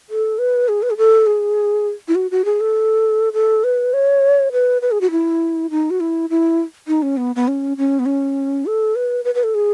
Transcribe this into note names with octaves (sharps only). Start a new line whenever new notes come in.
A4
B4
G#4
B4
G#4
A4
G#4
E4
F#4
F#4
G#4
A4
A4
B4
C#5
B4
B4
G#4
F#4
E4
D#4
F#4
E4
E4
D#4
C#4
B3
B3
C#4
C#4
B3
C#4
A4
B4
B4
B4
A4
G#4